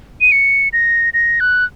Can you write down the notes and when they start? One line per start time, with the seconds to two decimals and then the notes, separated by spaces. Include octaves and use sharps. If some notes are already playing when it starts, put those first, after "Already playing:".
0.21 D#7
0.32 C#7
0.73 A#6
1.14 A#6
1.40 F#6